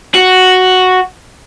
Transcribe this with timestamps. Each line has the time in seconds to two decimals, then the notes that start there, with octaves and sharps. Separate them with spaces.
0.15 F#4